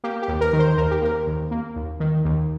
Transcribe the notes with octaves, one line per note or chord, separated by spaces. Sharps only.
A#3 G4
G4
D#2
A#4
D#3
C5
D#2 A#4
G4
A#3 A#4
D#2
A#3
D#2
D#3
D#2